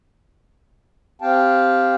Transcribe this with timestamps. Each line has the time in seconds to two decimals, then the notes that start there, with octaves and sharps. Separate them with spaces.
1.22 C4 G4 F5 G5 A5